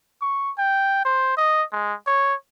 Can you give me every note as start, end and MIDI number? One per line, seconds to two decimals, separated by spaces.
0.22 0.51 85
0.58 1.03 79
1.05 1.36 72
1.37 1.64 75
1.72 1.94 56
2.07 2.35 73